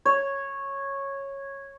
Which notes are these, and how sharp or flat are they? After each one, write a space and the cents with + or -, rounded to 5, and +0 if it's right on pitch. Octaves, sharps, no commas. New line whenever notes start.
C#5 -10